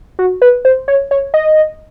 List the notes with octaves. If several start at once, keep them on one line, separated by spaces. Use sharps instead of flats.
F#4
B4
C5
C#5
C#5
D#5